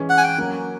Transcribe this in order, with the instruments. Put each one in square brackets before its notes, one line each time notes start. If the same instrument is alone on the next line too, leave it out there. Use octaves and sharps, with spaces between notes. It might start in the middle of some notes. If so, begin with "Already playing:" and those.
Already playing: [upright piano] E3 G#3 C#4
[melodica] F#5
G#5
G5
[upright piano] F#3 A#3 C#4